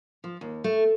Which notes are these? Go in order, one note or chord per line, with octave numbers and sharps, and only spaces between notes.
F3
D#2
A3